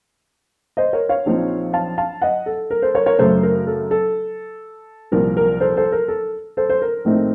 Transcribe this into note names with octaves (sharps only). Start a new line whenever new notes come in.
C5 D#5
A#4 C#5
C#5 F5
A#1 A#2 F3 C4 D#4
F5 A5
F5 A5
D#5 F#5
A4
A#4
A4 C5
A#4 C#5
A#4 C#5
F#2 C#3 A3 A4 C5
A#4
A4
A4
C2 A#2 F3 A#4
A#4
A4 C5
A4 C5
A#4
A4
A4 C5
C5
A#4
A#1 A2 A3 C4 D#4